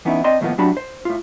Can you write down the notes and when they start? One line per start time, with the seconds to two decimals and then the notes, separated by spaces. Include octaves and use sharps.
0.05 E3 B3 C#4 D#4 E4
0.24 C4 C5 D5 D#5 A5 C6
0.41 D#2 A2 F3 G3 A#3 B3
0.58 A2 F#3 D4 F#4 G4 B5
0.77 C5
1.05 A2 F4